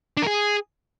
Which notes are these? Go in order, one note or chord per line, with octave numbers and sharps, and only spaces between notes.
D4
A#4
G#4